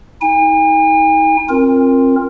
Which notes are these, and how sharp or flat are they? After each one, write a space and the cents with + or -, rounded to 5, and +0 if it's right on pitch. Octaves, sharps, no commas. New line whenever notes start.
D#4 +40 G#5 -45
C4 +30 F4 +0 A#4 +0